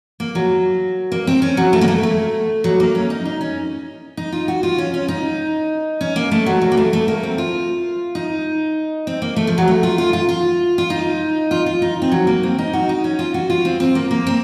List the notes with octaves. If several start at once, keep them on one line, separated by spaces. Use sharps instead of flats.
A#3
F#3
A#3
C4
C#4
F#3
A3
A#3
A3
A3
F#3
A#3
C#4
D#4
D#4
C#4
D#4
F4
F#4
F4
C#4
C#4
D#4
C#4
A#3
A3
F#3
F#3
A#3
A3
A3
A#3
C4
F4
D#4
C4
A#3
A3
F3
F#3
A3
F4
F4
F4
F4
F4
D#4
F4
F4
D#4
C4
F#3
A#3
C4
D#4
F#4
D#4
C#4
F4
F#4
F4
C4
C4
A#3
A#3
C4